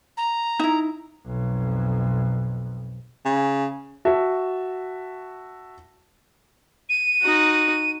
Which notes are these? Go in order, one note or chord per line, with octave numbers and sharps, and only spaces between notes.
A#5
D#4 E4
B1 F2
C#3
F#4 E5 A5
D#7
D#4 F#4